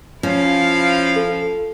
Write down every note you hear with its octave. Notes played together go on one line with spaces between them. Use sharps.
F3 C#4 E4 F5
A4